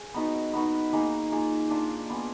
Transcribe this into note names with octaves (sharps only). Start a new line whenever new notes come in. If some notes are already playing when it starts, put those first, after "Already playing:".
Already playing: G#4
B3 D#4 F#4 B4
B3 D#4 F#4 B4
A#3 D#4 G#4 D#5
A#3 F4 G#4
D4 F4 A#4
B3 F4 G#4